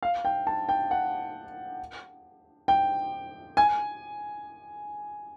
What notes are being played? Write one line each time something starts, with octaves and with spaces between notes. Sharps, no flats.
F5
G5
A5
G5
F#5
G5
G#5